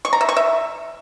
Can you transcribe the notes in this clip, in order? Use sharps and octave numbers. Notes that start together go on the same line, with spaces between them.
C#6
A#5
E5
C#6
E5